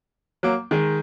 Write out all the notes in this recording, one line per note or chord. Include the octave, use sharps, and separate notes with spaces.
F#3 A#3
D#3 G#3